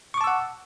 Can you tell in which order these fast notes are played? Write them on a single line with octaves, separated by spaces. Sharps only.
C#6 D6 A5 E6 F#5